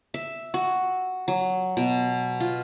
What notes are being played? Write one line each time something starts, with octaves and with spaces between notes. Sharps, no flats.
E5
F#4
F#3
B2
F4